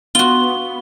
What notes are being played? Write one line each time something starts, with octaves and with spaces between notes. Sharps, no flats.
B3 F4 F#4 G7